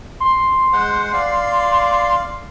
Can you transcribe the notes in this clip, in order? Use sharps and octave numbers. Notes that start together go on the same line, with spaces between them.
C6
G#3 C5 F#5
D5 F5